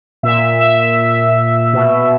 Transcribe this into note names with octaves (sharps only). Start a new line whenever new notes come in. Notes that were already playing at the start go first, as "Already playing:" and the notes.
A#2 E5
E5
B2